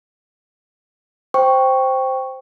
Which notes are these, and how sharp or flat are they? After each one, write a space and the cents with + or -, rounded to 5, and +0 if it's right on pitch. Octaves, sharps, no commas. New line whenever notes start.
C5 +0 G5 +0 C#6 +0